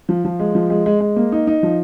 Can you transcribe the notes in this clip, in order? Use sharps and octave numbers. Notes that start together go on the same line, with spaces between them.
F3
F3
G#3
F3
G#3
G#3
G#3
A#3
D#4
D#4
F3